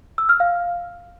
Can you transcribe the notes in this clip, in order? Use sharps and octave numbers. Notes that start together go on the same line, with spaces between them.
E6
F6
F5